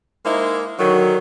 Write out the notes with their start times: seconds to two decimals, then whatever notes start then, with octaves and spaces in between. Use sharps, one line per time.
0.24 G#3 A#3 D#4 E4 C5
0.78 D3 D#3 F#3